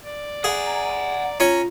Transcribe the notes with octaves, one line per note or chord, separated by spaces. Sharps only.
D5
G#4 F#5 G#5
A#5
C#4 F4 C#5 A#5